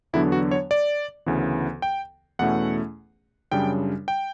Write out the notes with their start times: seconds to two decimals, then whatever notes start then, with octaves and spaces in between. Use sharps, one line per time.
0.13 E2 D3 F#3 B3 D4 E4
0.32 F#4
0.51 C#5
0.71 D5
1.26 D2 C#3 E3 B3
1.82 G5
2.39 E2 B2 A3 C#4 E4 F#5
3.51 F#2 C#3 G3 D4 G5
4.08 G5